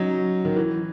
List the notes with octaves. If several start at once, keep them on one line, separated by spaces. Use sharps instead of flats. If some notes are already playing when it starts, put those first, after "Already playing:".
Already playing: F#3 C#4 D#4
D#3
E3